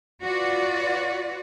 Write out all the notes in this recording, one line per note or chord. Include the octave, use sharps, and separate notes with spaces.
F4 F#4 B4 D5